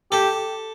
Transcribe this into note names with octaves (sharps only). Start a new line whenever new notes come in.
G4 A4